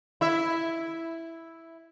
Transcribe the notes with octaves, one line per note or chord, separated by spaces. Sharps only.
E4 E5